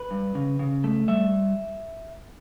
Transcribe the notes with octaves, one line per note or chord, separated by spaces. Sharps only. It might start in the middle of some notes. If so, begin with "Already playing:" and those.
Already playing: B4
G2
C#3
C#3
A3
G3 E5